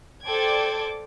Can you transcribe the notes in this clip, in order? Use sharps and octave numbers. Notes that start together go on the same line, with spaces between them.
A4 C5 D5 G5 D6 G#6